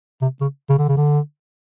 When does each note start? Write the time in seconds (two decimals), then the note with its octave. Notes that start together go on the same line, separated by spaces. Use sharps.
0.22 C3
0.41 C#3
0.69 C#3
0.79 D3
0.88 C#3
0.97 D3